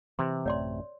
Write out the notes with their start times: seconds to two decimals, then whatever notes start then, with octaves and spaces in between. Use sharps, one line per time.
0.19 C3 E3 C6
0.46 A1 F#2 A3 C#5 D5 C6